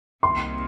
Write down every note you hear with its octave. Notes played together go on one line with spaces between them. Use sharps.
C2 C3 D#3 A#3 C6